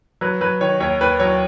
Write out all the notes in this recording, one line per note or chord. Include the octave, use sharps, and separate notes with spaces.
F#3 B4
F#3 B4
D#3 C#5
D#2 C#5
D#2 B4
F#3 C#5